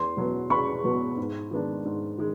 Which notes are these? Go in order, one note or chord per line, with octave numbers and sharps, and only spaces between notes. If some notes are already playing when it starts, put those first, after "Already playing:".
Already playing: E2 C6
B2 F#3 B3
E2 B5 C#6
B2 F#3 B3
G#2
D#3 G#3 B3 D4
G#2
D#3 G#3